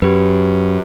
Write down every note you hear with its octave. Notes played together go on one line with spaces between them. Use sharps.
F#2 G4 B4